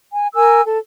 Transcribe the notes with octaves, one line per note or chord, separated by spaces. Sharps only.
G#5
A#4 G#5 E6
A4